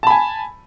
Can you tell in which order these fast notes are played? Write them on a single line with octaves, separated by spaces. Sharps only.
A5 B5 G#5